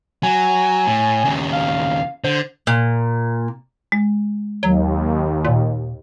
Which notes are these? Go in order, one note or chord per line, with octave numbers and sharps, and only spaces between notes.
F#3 G#5
A2
D#2 C#3
F5
D3 C5
A#2
G#3
D#2 F#3
A#2